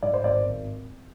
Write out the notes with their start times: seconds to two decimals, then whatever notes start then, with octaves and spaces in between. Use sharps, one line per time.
0.03 G#2 D5
0.14 C5
0.23 G#1 D5
0.44 G#1